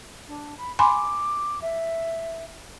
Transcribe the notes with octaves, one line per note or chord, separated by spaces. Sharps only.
D4
B5
G#5 B5 C6 D6
E5